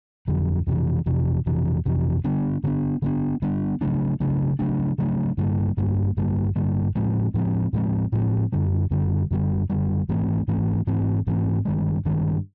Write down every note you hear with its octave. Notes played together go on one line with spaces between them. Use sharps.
F2 D3 F#3
F2 C3 E3
F2 C3 E3
F2 C3 E3
F2 C3 E3
D3 G3 B3 D4
D3 G3 B3 D4
D3 G3 B3 D4
D3 G3 B3 D4
C#3 F#3 A3 D4
C#3 F#3 A3 D4
C#3 F#3 A3 D4
C#3 F#3 A3 D4
G2 D3 G3 A#3
G2 D3 G3 A#3
G2 D3 G3 A#3
G2 D3 G3 A#3
A2 F3 G#3 C4
A2 F3 G#3 C4
A2 F3 G#3 C4
A2 F3 G#3 C4
F#2 D3 G3
F#2 D3 G3
F#2 D3 G3
F#2 D3 G3
G#2 E3 A3 C4
G#2 E3 A3 C4
G#2 E3 A3 C4
G#2 E3 A3 C4
G2 D#3 G#3
G2 D#3 G#3